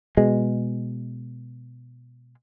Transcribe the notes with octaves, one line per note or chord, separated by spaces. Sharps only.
B2 G#3